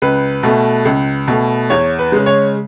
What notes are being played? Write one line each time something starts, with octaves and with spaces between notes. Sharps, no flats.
C#2 B4
B2 A3
C#2
B2 A3
E2 C#5
B4
C#3 G#3
C#5